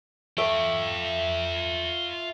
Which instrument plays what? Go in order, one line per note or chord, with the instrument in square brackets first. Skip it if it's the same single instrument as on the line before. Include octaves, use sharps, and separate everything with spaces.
[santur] A3 E5 D6 [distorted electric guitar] F4 G5